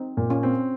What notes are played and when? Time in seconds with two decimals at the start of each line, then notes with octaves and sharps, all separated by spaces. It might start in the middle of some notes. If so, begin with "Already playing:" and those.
Already playing: C4 D#4
0.17 A#2
0.30 C#4 F4
0.43 C4